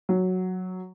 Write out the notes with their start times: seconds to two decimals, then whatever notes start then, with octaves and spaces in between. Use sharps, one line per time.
0.09 F#3